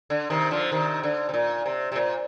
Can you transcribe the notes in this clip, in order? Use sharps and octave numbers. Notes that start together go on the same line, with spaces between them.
D3
C3 D#3
D3 F3
C3 D#3
D3
C3
A#2
C3
C3
A#2